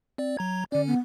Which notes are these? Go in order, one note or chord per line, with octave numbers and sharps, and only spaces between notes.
C4 D5
F#3 A#5 G#6
D3 C#4 D5
B3